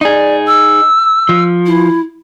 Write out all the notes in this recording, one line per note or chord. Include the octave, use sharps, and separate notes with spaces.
D#4 G#4 D5
E6
F3
E4